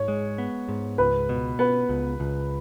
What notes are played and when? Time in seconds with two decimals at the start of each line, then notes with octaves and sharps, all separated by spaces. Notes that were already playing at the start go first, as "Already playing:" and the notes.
Already playing: G#2 C#5
0.08 G#3
0.38 B3
0.68 G#2
0.98 C#2 B4
1.29 B2
1.59 B3 B4
1.89 C#2
2.20 C#2